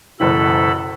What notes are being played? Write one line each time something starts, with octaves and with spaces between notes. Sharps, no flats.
F#1 B2 E3 A4 B5